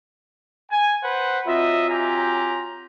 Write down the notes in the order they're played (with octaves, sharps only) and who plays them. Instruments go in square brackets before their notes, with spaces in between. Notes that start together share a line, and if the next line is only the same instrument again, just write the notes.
[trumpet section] G#5
B4 C5 F#5
[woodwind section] F#3 C4 F4 [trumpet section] D#5 E5
[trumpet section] G4 G#5 A#5